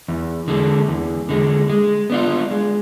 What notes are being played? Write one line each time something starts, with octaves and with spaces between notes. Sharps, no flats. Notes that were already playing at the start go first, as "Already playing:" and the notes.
E2
D3 G#3
E2
D3 G#3
G#3
B3 D4 F4
G#3